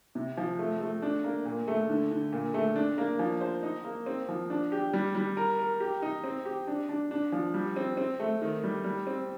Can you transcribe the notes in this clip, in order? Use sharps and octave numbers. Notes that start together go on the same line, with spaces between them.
C3
F3
A3
A3
D4
A#3
A#2
A3
D3
D3
A#2
A3
D4
A#3
F3
C5
D#4
A#3
C4
F3
D4
G4
G3
G3
A#4
A#4
G4
D#4
C4
G4
D4
D4
D4
F3
G3
C4
C4
A3
D#3
G3
G3
C4